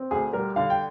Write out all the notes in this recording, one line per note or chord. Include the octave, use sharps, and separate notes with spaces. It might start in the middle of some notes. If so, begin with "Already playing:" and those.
Already playing: C4
D2 G#4
G3 A#4
D3 F5
G5